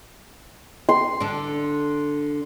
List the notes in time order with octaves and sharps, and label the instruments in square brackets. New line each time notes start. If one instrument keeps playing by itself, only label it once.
[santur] C6
[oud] D3 D4